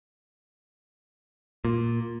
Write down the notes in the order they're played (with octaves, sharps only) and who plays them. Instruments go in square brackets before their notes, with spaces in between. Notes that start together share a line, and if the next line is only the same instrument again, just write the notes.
[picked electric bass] A#2